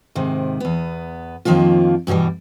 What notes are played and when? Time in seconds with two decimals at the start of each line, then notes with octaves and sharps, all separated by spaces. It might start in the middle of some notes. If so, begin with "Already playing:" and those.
0.15 G#2 C3 D#3
0.60 E2 B3
1.45 F2 D#3 F3 A#3 F4
2.07 G2 B2 D3 E3 G3